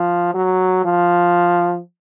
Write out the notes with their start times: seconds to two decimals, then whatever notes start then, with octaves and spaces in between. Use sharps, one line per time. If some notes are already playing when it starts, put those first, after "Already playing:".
Already playing: F3
0.34 F#3
0.85 F3